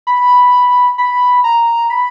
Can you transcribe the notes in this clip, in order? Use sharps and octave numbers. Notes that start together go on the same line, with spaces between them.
B5
B5
A#5
B5